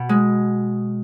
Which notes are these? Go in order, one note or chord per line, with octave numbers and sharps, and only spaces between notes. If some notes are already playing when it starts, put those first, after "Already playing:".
Already playing: B2
G#3